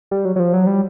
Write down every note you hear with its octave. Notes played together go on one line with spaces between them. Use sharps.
G3
F#3
F#3
F3
F#3
G3